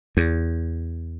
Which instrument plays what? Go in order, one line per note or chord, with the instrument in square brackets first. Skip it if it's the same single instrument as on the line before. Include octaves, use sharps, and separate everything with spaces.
[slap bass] E2